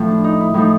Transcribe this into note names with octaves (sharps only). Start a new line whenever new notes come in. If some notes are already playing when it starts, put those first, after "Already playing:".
Already playing: A2 F3
D4
D#4
E4
A2 F3 D#4